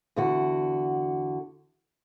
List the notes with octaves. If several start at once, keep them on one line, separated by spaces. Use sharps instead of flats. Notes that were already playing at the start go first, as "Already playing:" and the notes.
E2 D3 F#4